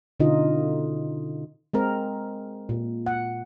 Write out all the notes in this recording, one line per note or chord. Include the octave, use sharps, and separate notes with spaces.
B2 D3 C#4 D#4 F4 D#5
G#3 C4 A#4
A#2
F#5